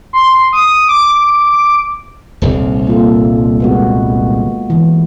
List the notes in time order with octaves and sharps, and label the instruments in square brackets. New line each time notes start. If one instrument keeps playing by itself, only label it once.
[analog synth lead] C6
D#6
D6
[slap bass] D#1 C2
[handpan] A#3 F4 A4
G#3 B3 F#4
E3